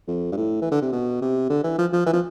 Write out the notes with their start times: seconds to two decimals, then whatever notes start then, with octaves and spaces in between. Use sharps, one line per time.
0.08 F2
0.32 G2
0.36 A2
0.61 E3
0.71 D3
0.82 C3
0.92 B2
1.22 C3
1.49 D3
1.64 E3
1.78 F3
1.93 F3
2.06 E3
2.13 F3